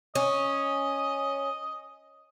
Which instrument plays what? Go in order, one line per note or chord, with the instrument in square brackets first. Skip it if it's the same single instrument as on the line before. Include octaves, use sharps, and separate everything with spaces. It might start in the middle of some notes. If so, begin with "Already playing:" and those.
[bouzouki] C#4 [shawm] D#5